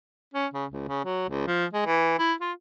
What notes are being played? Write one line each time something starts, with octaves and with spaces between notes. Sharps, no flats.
C#4
C#3
C#2
C#3
F#3
C#2
F3
G#3
E3
E4
F4